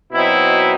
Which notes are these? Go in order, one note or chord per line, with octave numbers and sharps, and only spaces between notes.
B2 F#3 C4 D#4 E4